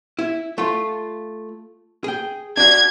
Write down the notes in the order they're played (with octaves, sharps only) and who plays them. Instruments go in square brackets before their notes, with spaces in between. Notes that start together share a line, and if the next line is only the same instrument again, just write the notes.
[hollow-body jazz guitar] E4
A3 F4
G#4 G5
[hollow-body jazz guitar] D4 F#4 [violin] G#6